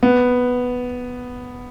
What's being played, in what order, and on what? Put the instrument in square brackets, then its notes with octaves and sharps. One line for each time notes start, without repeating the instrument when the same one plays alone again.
[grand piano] B3